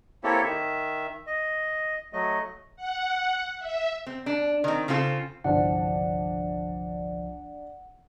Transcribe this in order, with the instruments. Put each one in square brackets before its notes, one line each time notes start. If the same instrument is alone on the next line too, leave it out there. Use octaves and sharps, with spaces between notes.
[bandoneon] A#3 C4 E4 G4 A4 C#5
D#3 E5
D#5
F#3 A3 D#5
[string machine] F#5
E5
[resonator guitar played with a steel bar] C4
D4
D#3 C4
C#3 C4 F4 A4
[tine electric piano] G1 C2 F3 [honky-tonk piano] D4 [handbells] F#5